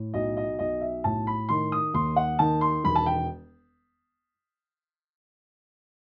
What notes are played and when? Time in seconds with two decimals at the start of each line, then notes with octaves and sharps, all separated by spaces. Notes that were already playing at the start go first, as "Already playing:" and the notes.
Already playing: A2
0.14 B1 D#5
0.37 D#5
0.59 B1 D#5
0.81 E5
1.04 A2 A5
1.27 B5
1.49 D#3 C6
1.72 D#6
1.94 D#2 C6
2.16 F#5
2.39 D#3 A5
2.61 C6
2.84 E1 B5
2.95 A5
3.06 G5